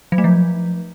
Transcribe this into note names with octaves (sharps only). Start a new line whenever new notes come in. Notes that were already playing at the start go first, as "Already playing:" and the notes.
F#3
A3
F3